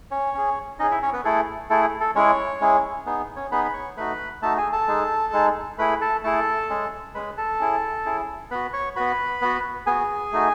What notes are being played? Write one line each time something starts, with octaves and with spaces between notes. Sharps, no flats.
C#4 C#5
C#4 G#4
C#4 D#4 G#4 D#5
E4 E5
C#4 C#5
B3 B4
A3 E4 G#4 A4
A3 E4 G#4 A4
A4
G#3 C#4 E4 G#4 C#5
G#3 C#4 E4 G#4
B3 D#4 G#4
C#4 C#5
B3 D#4 G#4 B4 B5
B5
C#5 C#6
A3 D#4 F#4 B4 B5
A3 D#4 F#4 A4 A5
G#4 G#5
A4 A5
G#3 D#4 G#4
G#3 D#4 G#4
A3 E4 G#4 B4 B5
A4 A5
A3 E4 G#4 A4 A5
G#3 C#4 G#4
G#3 C#4 G#4 B4 B5
A4 A5
C#4 E4 G#4
C#4 E4 G#4
B3 F#4 B4 B5
C#5 C#6
B3 F#4 B4 B5
B3 F#4
B3 F#4 G#4 G#5
A3 D#4 F#4